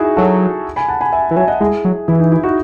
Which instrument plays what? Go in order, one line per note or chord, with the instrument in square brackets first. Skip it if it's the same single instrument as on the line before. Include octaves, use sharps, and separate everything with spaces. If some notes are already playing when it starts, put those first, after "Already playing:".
Already playing: [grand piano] D#4 E4 F#4 G#4
[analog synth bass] F#3 [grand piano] F#4 A4
[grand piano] G#5 B5
F#5 A5
G#5 B5
E5 G#5
[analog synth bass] E3
[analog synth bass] F#3 [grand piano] E5 G#5
[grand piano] D#5 F#5
[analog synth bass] G#3 [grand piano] E4 G#4
[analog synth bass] F#3
[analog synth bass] E3 [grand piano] E4
[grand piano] D#4
E4
D#4 F#4